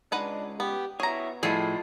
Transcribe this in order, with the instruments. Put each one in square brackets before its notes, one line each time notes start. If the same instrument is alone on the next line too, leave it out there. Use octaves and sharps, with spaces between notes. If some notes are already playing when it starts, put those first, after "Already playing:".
[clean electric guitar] C#2 G#3 [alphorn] D4 [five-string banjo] D#4 B4 F#5
[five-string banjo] B3 [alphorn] G4
[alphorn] B3 [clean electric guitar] E4 F#4 C#5 [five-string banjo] G#4 A#5
[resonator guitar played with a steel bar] A2 F3 G#4 [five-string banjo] G3 [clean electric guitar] F4 D#5